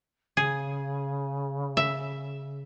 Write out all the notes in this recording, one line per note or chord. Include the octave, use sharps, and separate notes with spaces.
C#3 G#4
E5